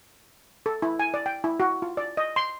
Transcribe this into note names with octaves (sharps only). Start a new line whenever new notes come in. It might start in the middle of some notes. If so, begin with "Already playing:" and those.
A4
E4
G#5
D5
G5
E4
F#4
F4
D5
D#5
C6